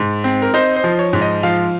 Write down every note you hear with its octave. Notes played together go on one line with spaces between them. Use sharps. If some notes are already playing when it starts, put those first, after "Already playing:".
Already playing: G#2
C4
A#4
D#4 C5
C5
F3
C#5
G#2
D#5
F3 F5